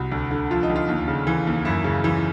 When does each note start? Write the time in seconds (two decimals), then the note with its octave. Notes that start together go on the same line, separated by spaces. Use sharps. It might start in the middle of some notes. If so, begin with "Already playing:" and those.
Already playing: C2 F#4
0.12 D2
0.31 D3
0.50 F3 F4
0.63 D#4
0.70 D2
0.76 F4
0.88 D#2
1.08 C#3
1.27 E3
1.47 D#2
1.65 F#2 E4
1.84 C#3
2.04 E3